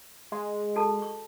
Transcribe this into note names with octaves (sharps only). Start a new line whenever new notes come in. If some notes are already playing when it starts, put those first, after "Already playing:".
G#3
F#4 A4 A5
C#6